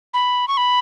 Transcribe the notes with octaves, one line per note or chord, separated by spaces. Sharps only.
B5
C#6
B5